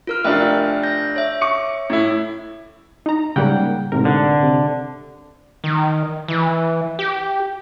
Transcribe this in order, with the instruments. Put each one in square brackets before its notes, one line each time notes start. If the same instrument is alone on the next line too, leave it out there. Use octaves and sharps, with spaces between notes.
[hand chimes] F4 A#4 F6
[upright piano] F1 D4 F4 [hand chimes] E5 G5
[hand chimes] G6 A#6
C#5 E5
[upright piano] C#6 D6 C#7
A2 E4
[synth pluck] D#4 A#5
[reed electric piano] G#2 F#5 G5 [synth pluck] C#3 G3 A#3
[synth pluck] A1 A#4 [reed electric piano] G#2 C3
[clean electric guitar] D3
[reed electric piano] C3
[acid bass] D#3
E3
G4